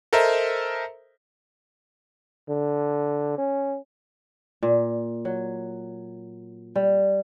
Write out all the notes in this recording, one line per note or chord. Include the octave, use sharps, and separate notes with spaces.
A4 A#4 C5 D#5 E5 A#5
D3
C#4
A#2
F#3
G3